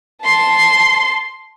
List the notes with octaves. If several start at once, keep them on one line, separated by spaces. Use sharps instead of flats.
A5 C6